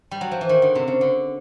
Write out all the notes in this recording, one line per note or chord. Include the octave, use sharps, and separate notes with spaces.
G3
F#3
F3
E3
D#3
D3
C3
C#3
D3